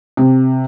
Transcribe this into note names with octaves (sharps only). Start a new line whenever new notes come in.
C3